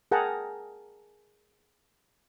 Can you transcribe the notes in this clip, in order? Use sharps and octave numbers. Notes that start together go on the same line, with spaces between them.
G#4 A#4 F#5 G5 A5 A#5